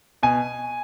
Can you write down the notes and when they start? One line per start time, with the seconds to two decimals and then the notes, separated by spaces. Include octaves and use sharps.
0.23 B2 G#5